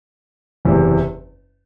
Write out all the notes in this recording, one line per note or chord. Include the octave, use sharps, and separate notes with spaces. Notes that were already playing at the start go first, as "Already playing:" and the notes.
F#1 E2 C3